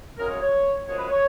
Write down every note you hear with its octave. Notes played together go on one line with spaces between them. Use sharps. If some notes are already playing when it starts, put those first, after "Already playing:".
F#2 C#3 G#3 A#4
C#5
C#5
F#2 F3 G#3 C#5
B4
C#5